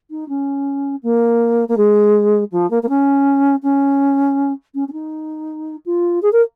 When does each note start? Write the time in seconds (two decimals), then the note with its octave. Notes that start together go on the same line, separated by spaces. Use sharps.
0.11 D#4
0.29 C#4
1.03 A#3
1.69 A#3
1.77 G#3
2.52 F3
2.71 A#3
2.83 A#3
2.89 C#4
3.63 C#4
4.75 C#4
4.88 C#4
4.93 D#4
5.86 F4
6.22 G#4
6.33 A#4